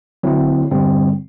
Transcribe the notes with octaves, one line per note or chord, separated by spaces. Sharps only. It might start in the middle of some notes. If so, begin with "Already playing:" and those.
D3 F#3 C4 E4
G2 D3 G3 C4